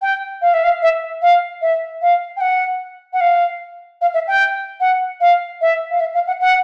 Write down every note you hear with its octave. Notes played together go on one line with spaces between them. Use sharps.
G5
F5
E5
F5
E5
F5
E5
F5
G5
F#5
F#5
F5
F5
E5
G5
F#5
F5
E5
F5
E5
F5
F#5
F#5